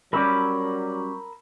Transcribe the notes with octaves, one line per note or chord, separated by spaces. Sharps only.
F#3 G3 C#4 A#4 D5 B5 E6